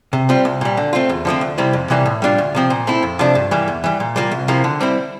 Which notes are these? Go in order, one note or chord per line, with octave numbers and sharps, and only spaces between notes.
C3
G3 C4 F4
C2
A#2 G3
D3
A3 C4 F4
E2
D3 F3 A3 C4
D2
C3 G3 C4 E4
F2
C3 E3 G3 A#3
A2
G3 D4 F4
D2
C3 F3 C4
A#2
A3 C4 E4
F2
C3 F3 A3 D4
G2
E3 G3 A#3
E2
E3 G3
A#2
G3 A#3 F4
C2
C3 F3 A#3 E4
D3
G3 C4 E4